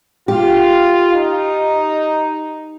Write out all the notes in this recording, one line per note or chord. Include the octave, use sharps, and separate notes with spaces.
F4 G4
D#4